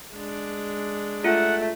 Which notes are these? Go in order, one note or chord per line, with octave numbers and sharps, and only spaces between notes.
G#3 D4
A3 F4 F#5